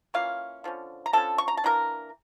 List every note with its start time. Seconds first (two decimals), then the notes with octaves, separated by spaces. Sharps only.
0.14 E3 A#3 C#4 F4 F5
0.64 D3 F3 C#4
1.06 A#5
1.13 D3 F3 C#4 A4 A5
1.38 C#6
1.48 A#5
1.57 A5
1.64 E3 A#3 D4 A#4 A#5